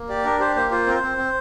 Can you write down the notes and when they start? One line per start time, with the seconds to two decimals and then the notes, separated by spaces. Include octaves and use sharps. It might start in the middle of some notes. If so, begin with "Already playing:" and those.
Already playing: A#3
0.09 G4 D5
0.24 D4 A#4
0.40 G4 C5
0.56 A#3 C5
0.71 F4 C5
0.86 C4 A#4
0.95 C5
1.02 C4
1.18 C4